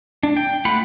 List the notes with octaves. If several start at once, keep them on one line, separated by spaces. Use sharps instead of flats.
D4
G5
A3 F4 F#5 B5